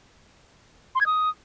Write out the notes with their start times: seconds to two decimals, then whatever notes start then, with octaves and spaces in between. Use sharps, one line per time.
0.95 C6
1.01 G#6
1.06 D#6